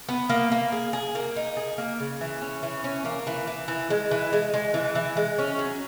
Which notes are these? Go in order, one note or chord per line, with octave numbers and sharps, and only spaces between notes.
B3
A#3
A#3
G#4
G#4
A#3
D#4
G#4
A#3
C#3
E3
C#4
E3
C#4
A#3
E3
E3
E3
G#3
E3
G#3
G#3
E3
E3
G#3
C#4
F#3